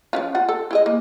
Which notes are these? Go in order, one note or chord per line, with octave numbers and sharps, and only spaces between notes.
F3 C#4 F4
F4 F#5
A4
E4 G#4 D#5
A#3